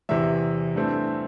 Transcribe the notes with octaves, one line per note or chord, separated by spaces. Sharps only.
E2 C3 E3 E5
G2 E3 A3 C4